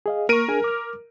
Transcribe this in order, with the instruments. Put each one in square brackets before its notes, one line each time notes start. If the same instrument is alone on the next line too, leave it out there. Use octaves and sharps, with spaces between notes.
[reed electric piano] G#4 D#5 F5
[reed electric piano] A#3 C#6 [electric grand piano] A#4 D7 D#7
[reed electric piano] D4 G#4 G#5
D6 F6